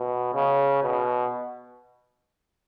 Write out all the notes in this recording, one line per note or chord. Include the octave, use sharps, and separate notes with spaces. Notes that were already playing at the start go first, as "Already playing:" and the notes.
Already playing: B2
C#3
B2